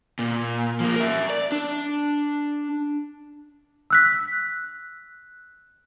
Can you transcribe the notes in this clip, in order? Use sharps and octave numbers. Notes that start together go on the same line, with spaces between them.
A#2
F3 A#3
A#4 E5
D5
D4
E6 F#6 B6